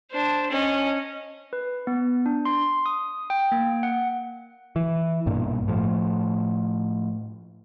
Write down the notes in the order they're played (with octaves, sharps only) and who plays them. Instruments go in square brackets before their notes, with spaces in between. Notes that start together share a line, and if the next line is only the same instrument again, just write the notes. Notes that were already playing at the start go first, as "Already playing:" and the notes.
[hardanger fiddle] D4 C5
C#4 D#5
[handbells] B4
B3
D4
C6
D#6
G5
A#3
F#5
[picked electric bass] E3
B1 G2 A#2
A2 F3